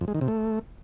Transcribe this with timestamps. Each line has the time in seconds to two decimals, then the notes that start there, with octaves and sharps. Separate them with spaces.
0.01 F2
0.08 G#3
0.15 D#3
0.21 C3
0.28 A3